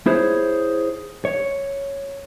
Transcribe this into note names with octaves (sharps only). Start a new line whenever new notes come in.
E4 G#4 C5 C#5
C#5